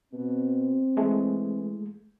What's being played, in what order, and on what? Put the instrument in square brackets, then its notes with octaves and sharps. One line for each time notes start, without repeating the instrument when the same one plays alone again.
[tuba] B2 [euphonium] C4
[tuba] E3 [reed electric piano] G#3 A3